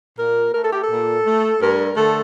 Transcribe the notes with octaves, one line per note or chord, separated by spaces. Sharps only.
A#2 A#4
A3 A#4
A4
G4
A4
A#2
A3
G2 A#4
D3 A3 A4